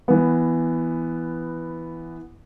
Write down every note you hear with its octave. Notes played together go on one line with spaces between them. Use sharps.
E3 B3